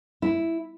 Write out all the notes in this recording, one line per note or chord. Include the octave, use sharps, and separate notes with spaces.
E4